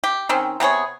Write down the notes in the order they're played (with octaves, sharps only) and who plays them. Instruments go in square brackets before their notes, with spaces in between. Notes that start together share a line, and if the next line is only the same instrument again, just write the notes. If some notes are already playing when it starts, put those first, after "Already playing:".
[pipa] G4
D#3 C4 C#4
C3 B3 G#4 C#5